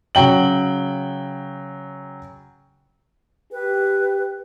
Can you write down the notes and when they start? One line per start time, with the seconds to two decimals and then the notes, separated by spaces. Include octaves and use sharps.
0.15 C#3 F#3 G5 F#7
3.52 G4 B4